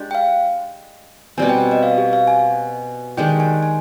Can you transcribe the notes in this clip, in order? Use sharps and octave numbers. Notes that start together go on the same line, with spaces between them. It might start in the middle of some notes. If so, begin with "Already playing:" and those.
Already playing: G#3 D4 G4
G5
F5
B2 G3 C4 G#5
G5
D#5
F5
G4
F5
G#5
D#3 G#3 D4 G4 G5
G#5
G#5